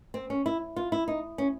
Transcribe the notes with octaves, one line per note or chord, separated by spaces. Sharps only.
C4
C#4
E4
F4
E4
D#4
C#4